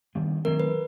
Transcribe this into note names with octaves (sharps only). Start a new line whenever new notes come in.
D#3 G3 B3 D4
D#3 F#3 A3 C4 A#4
B4